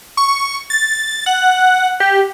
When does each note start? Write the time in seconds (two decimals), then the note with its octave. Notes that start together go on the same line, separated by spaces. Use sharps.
0.17 C#6
0.70 A6
1.26 F#5
2.00 G4